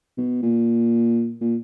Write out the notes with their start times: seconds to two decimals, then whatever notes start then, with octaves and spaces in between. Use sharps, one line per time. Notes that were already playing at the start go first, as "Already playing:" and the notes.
0.18 B2
0.43 A#2
1.41 A#2